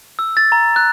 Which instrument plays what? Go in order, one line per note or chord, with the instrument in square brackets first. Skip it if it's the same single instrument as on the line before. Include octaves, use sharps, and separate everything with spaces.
[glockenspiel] E6
A6
A#5
F#6